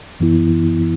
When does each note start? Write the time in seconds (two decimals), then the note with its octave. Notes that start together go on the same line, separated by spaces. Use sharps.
0.20 F#2 E3 B3 E4